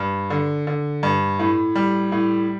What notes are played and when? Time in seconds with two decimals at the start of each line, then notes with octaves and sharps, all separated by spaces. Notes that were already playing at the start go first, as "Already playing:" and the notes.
Already playing: G2
0.30 D3
0.67 D3
1.03 G2
1.39 A2
1.75 G3
2.12 A2